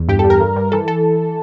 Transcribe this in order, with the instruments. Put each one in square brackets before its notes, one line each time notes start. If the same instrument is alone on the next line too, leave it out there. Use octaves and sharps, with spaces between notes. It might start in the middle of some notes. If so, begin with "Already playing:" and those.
Already playing: [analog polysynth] E2
G2 G4
G2 A4
A#4
G2
G2
E3 A4
A4